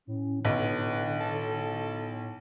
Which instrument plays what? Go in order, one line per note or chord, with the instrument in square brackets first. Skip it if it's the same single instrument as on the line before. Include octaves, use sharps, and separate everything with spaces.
[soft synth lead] A2 [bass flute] C#4
[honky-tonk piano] B1 [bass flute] D3 [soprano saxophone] B4
[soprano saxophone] A4